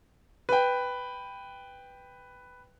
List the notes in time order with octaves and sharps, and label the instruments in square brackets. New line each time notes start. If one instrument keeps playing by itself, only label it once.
[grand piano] B4 G5